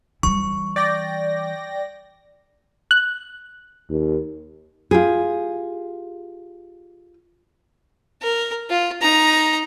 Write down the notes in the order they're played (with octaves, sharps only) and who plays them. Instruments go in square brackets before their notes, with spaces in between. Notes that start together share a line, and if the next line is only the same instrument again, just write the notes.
[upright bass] E3 G3 [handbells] C#6
[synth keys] D5 G5 A#6
[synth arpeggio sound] F#6
[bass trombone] D#2
[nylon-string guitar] F4 G4 G#4
[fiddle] A#4
F4
D#4 A#5